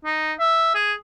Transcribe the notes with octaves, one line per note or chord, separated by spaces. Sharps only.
D#4
E5
G#4